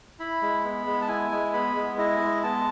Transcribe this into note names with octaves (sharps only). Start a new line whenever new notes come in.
E4 B5
G#3
B3
G#3
A5
E4 G#5
G#3
B3 B5
G#3
E4 D#5
G#3
B3 A5